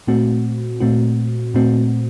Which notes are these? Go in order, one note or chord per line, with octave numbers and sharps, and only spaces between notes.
A#2 A3 C4 F#4
A#2 A3 C4 F#4
A#2 A3 C4 F#4